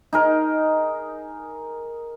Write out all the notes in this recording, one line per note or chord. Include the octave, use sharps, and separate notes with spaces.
D#4 G#4 A#4